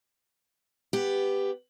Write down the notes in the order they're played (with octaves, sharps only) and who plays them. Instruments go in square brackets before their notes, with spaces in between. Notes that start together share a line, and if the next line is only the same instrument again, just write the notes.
[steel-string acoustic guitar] B3 G4